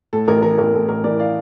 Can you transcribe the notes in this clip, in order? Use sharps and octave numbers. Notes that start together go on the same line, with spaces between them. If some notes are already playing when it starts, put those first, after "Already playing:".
A2 A4
A1 A#4
E3 A#4
A1 A#4
A2 A4
A1 A#4
E3 A#4 D5
D5 F5